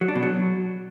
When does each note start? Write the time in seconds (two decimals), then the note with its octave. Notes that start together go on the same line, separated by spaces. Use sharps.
0.01 F#3
0.08 D4
0.15 B2
0.23 F#3